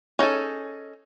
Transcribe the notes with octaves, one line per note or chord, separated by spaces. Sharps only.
C#4 D#4 G#4 A4